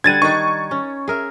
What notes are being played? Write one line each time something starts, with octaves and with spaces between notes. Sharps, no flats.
D3 G3 F#5 G#6 A6 D#7
D#3 D4 D#4 C#6
C#4
G#4 A#4 E5